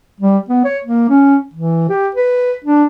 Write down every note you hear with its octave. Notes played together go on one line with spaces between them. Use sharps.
G3
B3
C#5
A#3
C#4
E3
G4
B4
D4